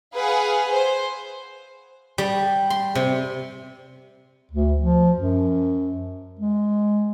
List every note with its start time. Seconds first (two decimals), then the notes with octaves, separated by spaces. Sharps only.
0.14 G#4 B4 F5 F#5 G#5
0.72 C5
2.18 G3
2.70 C6
2.95 C3
4.51 D2
4.80 F3
5.17 F#2
6.39 G#3